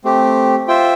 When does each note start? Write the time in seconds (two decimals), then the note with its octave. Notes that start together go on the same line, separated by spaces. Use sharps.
0.05 A3 C4 G4
0.68 F4 C5 E5 G5